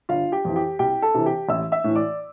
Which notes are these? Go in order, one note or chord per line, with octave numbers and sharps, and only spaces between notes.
G1 F4 F5
G4 G5
F2 E3
G4 G5
C2 G4 G5
A4 A5
C3 E3
G4 G5
A1 E5 E6
E5 E6
A2 E3
D5 D6